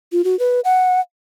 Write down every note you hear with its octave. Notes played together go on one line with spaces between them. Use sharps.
F4
F#4
B4
F#5